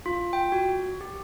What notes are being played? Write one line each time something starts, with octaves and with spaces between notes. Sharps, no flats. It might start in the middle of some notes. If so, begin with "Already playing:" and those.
F4
G5
F#4
G4